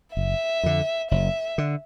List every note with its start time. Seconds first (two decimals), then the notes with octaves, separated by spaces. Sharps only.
0.16 F#1 E5
0.63 F2 D3
1.11 F#1 E5
1.58 D3